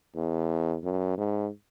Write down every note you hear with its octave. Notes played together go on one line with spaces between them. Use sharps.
E2
F#2
G#2